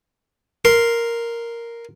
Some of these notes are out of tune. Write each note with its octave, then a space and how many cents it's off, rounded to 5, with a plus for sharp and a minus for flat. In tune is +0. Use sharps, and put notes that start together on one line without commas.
A#4 +0 C6 +0